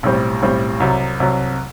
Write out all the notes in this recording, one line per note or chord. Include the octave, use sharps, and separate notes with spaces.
B1 A2 G3 C4
B1 A2 G3 C4
C2 C3 F#3
C2 C3 F#3